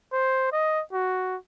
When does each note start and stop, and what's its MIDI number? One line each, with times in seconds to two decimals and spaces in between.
0.13 0.48 72
0.52 0.81 75
0.93 1.36 66